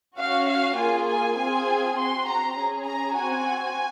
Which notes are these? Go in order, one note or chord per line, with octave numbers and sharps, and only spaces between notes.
C#4 F#4 F5
F5
A#3 F4 G#4 G#5
G#5
C4 F4 G#4 G#5
C4 F#4 C6
A#5
C#4 G#4
A#5
C4 F#4 G#5